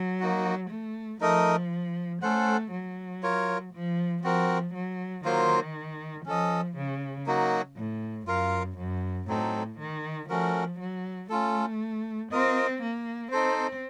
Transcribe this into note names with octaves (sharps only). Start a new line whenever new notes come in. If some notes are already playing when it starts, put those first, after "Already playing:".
Already playing: F#3
A#3 D#4 F#4
A3
F3 A3 D#4 A#4 D#5
A3 C#4 A4 C5 F#5
F#3
F4 A#4 C#5
F3
F3 C4 F#4 A#4
F#3
D#3 F#3 A#3 F4 C5
F3 C#4 A4 D#5
C#3
F#3 A#3 D#4 F#4
A2
F#2 F4 A#4 F5
F#2
A2 F#3 C4 D#4 A4
D#3
F3 A3 C#4 F#4 A#4
F#3
A3 C#4 F4 A4
C4 F4 A#4 D#5
A#3
C4 D#4 A4 C5